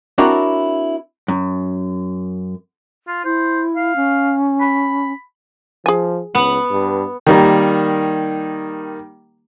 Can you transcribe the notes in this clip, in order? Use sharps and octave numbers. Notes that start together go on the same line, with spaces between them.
C4 D4 E4 F#4 A#4 C#5
F#2
F4
E4 C5
F5
C#4
B5
F3 G#4 G#5
C#2 B3 F#5
G2
D#3 G3 A#3